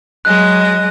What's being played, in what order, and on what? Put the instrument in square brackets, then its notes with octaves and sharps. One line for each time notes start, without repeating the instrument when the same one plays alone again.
[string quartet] F#3 G#3 D#5 [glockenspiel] F#6